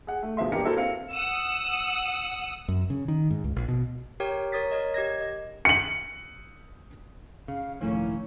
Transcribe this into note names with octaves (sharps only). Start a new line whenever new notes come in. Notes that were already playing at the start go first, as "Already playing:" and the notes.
G#4 F#5
A3
B2 F3 G#3 E5 C6
D#1 E3 D4 G4 A#4 C#7
E4 F#4 A4 A#4 C5
C4 F5 C#7
F#5 D#6 E6
F#2
C#3
D#3
G#2
C#2
A#1
B2
G4 A#4 C#5 G5
A#4 C#5 D#6 A6 B6
A#4 C#5 D#5
G4 D#5 G#6 A#6
D#5
C#7 F#7
C#3 F5
E1 A2 D#3 F3 A3 A#3 C#4 E4